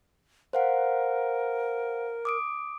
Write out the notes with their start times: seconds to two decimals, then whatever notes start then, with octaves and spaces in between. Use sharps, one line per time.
0.53 A#4 C5 F5 F#5
2.25 D6 D#6 D7